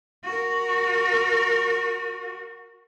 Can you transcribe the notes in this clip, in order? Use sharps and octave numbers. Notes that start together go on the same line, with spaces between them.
F#4 A#4